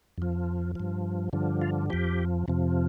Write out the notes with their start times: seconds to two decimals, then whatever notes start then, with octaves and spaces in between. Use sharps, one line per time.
0.18 F2 F3
0.75 G2 F3
1.33 G2 D3 F3
1.62 F4
1.90 F2 F3 G4
2.48 F2 C3 F3